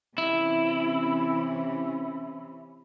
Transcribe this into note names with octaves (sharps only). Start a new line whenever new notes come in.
C3 E3 C#4 E4